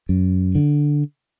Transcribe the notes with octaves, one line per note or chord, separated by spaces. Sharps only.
F#2
D3